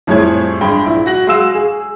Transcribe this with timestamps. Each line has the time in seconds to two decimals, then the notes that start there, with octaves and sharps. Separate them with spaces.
0.07 F2 A2 G3 G#4 C#5 G#6
0.61 G2 G#3 G5 B5
0.86 A#1 E4
1.06 F#4 A#6 F#7
1.27 G#3 F#4 G#4 F5 E6 E7
1.55 G#4